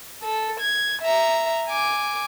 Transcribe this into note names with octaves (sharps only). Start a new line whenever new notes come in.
A4
G#6
E5 A#5
G#5 D6